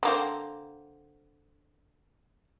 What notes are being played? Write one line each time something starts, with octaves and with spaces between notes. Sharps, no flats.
D3 A#3 C4